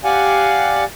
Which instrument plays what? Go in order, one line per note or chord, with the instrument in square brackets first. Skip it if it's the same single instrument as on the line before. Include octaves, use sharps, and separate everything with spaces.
[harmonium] G4 D5 F5 F#5 G#5